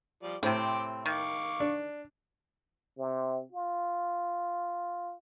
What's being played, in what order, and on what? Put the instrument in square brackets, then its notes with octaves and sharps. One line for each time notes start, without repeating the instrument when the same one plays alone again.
[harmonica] F3 G3 D5
[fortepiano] A2 [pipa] C3 C4 [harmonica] G5 C6 D6
[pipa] D#3 [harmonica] F5 C#6 D6
[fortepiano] D4
[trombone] C3
F4